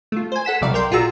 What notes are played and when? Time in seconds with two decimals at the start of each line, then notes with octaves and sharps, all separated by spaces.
0.12 A3 F4
0.32 C5 G#5
0.45 A4 F#5 B6 E7
0.61 C2 C3 F#3 G3 D5 F5
0.74 A#4 D5 G5 C6
0.91 A#1 F4 F#4 G#4 A#5 E6